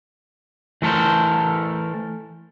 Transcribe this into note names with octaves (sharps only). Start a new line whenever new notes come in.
E3 A3 A4 A#4 C5